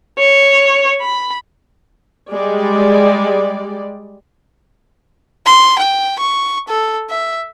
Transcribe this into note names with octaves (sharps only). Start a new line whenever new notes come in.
C#5
B5
G3 G#3 D5
C6
G5
C#6
A4
E5